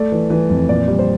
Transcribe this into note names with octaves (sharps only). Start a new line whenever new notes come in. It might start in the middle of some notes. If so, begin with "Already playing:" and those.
Already playing: A3 D5
E3
E3
F2
A#2 D5
G3
C5